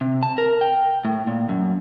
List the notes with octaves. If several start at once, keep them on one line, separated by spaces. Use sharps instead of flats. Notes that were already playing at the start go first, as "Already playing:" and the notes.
C3
A5
A#4
G5
A2
A#2
F#2